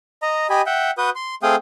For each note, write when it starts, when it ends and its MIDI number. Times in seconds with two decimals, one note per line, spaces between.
0.22 0.47 75
0.22 0.47 82
0.50 0.62 67
0.50 0.62 75
0.50 0.62 80
0.50 0.62 83
0.66 0.91 76
0.66 0.91 78
0.66 0.91 79
0.98 1.10 66
0.98 1.10 71
0.98 1.10 87
0.98 1.10 91
1.16 1.35 84
1.43 1.56 57
1.43 1.56 60
1.43 1.56 68
1.43 1.56 77
1.43 1.56 79
1.43 1.56 87